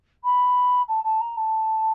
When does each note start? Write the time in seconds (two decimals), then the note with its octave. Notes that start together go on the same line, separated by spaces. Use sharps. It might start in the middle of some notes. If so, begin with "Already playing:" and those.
0.23 B5
0.88 A5
1.03 A5
1.20 A#5
1.36 A5